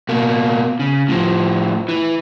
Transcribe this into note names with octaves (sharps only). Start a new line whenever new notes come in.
B2 A#3
C#3
A2 F3
E3